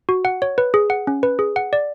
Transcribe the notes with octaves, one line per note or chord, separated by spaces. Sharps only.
F#4
F#5
C#5
B4
G#4
F#5
C#4
B4
G#4
F#5
D5